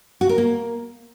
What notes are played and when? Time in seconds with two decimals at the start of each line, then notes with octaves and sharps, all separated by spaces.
0.21 F#4
0.29 A#4
0.38 A#3